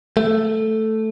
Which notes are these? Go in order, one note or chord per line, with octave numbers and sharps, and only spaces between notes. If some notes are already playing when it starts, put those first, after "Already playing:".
A3